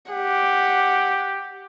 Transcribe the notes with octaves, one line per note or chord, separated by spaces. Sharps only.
G4 F#5